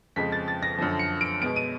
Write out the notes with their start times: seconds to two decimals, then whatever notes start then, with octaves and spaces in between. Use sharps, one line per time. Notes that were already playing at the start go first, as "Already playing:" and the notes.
0.16 F2 C#3 F3 G#3 B6
0.32 A6
0.48 A6
0.63 A#6
0.78 F#2 D3 F3
0.99 C#7
1.21 D7
1.41 B2 G#3 B3 D7
1.56 D#7